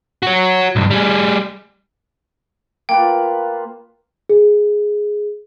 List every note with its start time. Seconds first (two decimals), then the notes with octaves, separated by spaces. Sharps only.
0.23 F#4 C#5
0.76 B1 G2
0.91 G3 G#4
2.89 A#3 F4 B4 G5
4.29 G#4